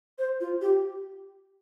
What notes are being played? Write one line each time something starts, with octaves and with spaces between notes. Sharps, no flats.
C5
F4
G4